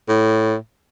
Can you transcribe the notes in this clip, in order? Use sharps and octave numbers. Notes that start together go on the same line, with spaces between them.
A2